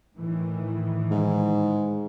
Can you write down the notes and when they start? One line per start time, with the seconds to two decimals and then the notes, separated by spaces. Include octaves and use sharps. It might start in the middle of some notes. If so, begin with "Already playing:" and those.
0.15 A2 D#3 E3
1.11 G#2